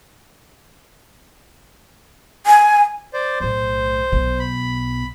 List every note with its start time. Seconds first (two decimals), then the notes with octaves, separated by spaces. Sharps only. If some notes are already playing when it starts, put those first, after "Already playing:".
2.47 G#5
3.14 C5 D5
3.40 B1 A2 C5
4.12 B1 B2
4.40 B5